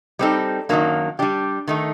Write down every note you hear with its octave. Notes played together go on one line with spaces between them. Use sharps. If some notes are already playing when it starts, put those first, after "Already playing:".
G3 C4 D#4 A4
F#2 D#3 F#3 A#3 D4
G3 D4 G4
D#3 A3 D#4 A4